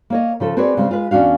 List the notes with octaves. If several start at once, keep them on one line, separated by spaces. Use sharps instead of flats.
A#3 C#5 D#5
C#3 F3 A4
C4 F#4 G#4 B4 C#5 D5
C#3 G3 G#3 C4
G#3 F4 B4
E2 C#4 D4 F#4 F5